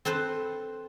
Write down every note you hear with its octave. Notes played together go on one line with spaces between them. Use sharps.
C4 A4 B4 C5